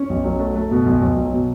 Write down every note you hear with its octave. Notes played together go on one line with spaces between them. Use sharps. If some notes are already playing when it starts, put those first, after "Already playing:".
Already playing: C#4
B1
F#3
A3
A3
B2
B1
B1
F#3
B2